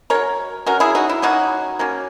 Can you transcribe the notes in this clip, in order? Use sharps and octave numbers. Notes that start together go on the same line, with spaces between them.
F#3 C#4 A#4 C#5
F#3 C#4 F#4 A#4
E4 G#4
D#4 F#4
E4
F#3 A#3 C#4 D#4 F#4
F#3 A#3 C#4